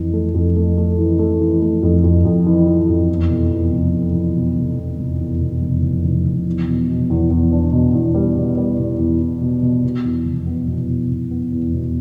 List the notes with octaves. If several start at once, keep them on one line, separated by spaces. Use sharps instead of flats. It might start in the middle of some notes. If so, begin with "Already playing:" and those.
Already playing: F2 E3
A3
F2
A3
A3
E3
A3
E3
A3
F2
F2
F2
E3
E3
F2
E2
B2
E2
F1
E2
E2
B2
F1
E2
F1
E2
B2
F1
F1
F1
F1
E2
B2
B2
E2
E2
D4
B2
E2
G3
B2
G3
B2
E2
E2
B2
B2
B2
E2
F1
B3
B2
B2
B2
B3
E2
B2